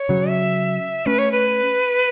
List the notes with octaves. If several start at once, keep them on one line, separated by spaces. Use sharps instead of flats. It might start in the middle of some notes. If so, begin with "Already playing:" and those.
Already playing: C#5
C#3 F#3
E5
A3 C#4 B4
C#5
B4